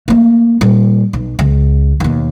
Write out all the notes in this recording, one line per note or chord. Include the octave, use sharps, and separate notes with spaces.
A3 A#3
A#2 G3
B1
C#2
D#2 B2